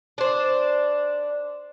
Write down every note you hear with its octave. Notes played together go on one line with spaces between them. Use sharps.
D4 C5